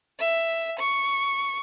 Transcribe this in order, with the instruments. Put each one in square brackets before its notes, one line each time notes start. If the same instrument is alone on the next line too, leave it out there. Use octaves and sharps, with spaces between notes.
[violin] E5
C#6